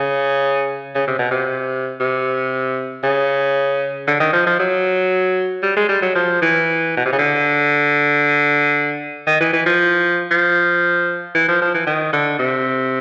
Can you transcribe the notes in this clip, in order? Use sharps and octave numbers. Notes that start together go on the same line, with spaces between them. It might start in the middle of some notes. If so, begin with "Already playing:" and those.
Already playing: C#3
C#3
C3
B2
C3
C3
C#3
D3
D#3
F3
F3
F#3
G3
G#3
G3
F#3
F3
E3
B2
C3
C#3
D3
D#3
E3
E3
F3
F3
E3
F3
F3
E3
D#3
D3
C3